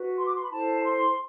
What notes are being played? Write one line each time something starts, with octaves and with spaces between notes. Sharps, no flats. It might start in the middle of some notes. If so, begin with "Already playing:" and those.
Already playing: F#4 B4
C6
D6
C6
B5
E4 A4 C5 A5
C6